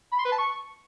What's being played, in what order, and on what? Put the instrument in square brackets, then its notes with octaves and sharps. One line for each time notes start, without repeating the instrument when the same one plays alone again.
[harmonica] B5
C6
B4
A5
C#6